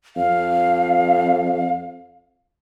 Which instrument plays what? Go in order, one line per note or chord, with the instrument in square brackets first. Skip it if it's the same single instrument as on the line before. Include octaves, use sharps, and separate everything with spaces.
[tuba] F2 [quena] F5